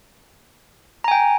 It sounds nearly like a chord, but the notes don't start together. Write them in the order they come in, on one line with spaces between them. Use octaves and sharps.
A#5 G#5 G5